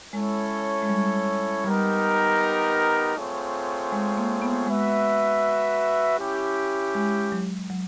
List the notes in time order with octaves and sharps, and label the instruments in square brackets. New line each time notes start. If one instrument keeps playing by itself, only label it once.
[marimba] G#3 [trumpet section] C#4 E4 A4 C#5
[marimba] G#3
G3
[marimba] G3 [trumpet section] B3 D#4 G4 A#4
[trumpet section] A3 C4 F4 G#4 C#5
[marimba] G#3
A#3
B3
[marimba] G#3 [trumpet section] F#4 B4 E5
[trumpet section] C#4 E4 G4
[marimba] G#3
F#3
F#3